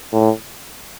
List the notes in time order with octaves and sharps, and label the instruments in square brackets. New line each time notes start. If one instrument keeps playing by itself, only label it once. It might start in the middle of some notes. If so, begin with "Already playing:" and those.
[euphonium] A2